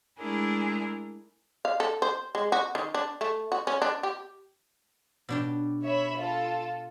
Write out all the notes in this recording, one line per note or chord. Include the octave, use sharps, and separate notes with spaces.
G#3 A3 D4 E4 G#4 A#4
F5
A4
C5
G#3
F#4
D#3
D4
A3
F#4
C#4
D4
G4
B2 D4 G4
C#5 E5 B5
F4 A4